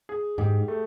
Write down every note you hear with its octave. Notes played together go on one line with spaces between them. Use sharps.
G#4
G#2 G4
A3